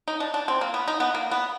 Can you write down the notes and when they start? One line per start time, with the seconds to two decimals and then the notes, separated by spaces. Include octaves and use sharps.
0.08 D#4
0.20 D4
0.34 D4
0.48 C4
0.61 A#3
0.74 B3
0.88 D#4
1.00 B3
1.15 A#3
1.31 B3